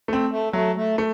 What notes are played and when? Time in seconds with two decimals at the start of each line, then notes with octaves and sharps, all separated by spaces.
0.08 A3 C4
0.31 A3
0.53 F#3 A3
0.76 A3
0.98 A3